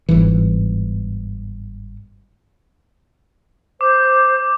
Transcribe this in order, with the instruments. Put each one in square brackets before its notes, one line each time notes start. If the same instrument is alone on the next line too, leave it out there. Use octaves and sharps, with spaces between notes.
[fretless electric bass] G1 G#2 E3
[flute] C5 [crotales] D6